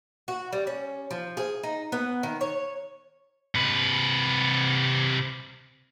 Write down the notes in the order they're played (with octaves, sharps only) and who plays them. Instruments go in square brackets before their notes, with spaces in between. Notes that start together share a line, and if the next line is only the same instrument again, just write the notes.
[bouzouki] F#4
G3
C#4
F3
G#4
D#4
B3
D#3
C#5
[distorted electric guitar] C3 B4